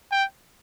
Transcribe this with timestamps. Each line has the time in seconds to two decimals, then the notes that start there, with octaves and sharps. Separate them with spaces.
0.12 G5